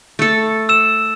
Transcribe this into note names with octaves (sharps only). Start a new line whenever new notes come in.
A3 A4
E6 E7